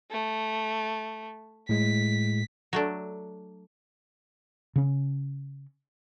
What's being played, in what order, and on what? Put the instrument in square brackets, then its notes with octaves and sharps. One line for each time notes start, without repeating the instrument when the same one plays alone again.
[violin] A3
[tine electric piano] A2 G#3 [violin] B6
[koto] F#3 A3 D4
[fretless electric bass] C#3 C#4